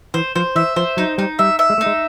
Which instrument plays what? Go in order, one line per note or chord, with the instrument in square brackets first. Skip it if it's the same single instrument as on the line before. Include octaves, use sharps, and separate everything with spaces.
[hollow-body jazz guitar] E3 [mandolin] C5
[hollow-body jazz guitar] F3 [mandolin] C5
[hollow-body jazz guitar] E3 [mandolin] E5
[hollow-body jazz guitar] F3 [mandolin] C5
[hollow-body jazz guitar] F#3 [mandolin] D#4
[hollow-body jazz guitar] G3 [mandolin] D#4
[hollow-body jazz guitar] G3 [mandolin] E5
[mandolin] E5
[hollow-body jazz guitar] G#3
[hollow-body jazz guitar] A3 [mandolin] D#4
[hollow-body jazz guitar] G#3